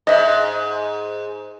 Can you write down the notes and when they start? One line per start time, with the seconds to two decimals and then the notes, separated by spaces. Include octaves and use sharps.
0.07 G#2 D#5 E5